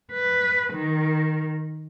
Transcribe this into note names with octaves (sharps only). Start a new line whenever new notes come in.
B4
D#3